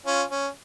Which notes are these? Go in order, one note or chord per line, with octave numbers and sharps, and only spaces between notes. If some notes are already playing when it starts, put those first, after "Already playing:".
C#4 F4
C#4